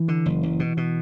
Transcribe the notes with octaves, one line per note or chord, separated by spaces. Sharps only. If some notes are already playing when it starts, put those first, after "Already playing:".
Already playing: E3
D3
F#1
F#1
B2
B2